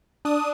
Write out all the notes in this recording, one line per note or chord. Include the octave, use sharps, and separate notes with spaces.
D4 D#6